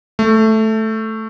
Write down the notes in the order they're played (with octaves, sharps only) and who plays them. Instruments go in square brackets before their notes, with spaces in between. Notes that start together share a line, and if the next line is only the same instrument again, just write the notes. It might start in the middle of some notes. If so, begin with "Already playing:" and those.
[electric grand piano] A3